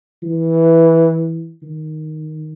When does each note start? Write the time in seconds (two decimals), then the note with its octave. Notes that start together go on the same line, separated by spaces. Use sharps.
0.23 E3
1.63 D#3